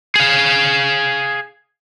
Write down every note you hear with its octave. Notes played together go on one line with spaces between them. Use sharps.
G#4 F5